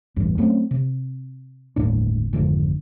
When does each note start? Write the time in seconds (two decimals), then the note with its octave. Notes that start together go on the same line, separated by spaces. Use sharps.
0.16 A1 E2 G2
0.38 F#3 A3 C4 C#4
0.71 C3
1.76 G1 D#2 A2 D4
2.33 G#1 F2 D3